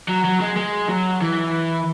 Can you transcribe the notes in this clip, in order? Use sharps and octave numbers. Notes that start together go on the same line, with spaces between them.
F#3
F#3
G#3
G#3
F#3
E3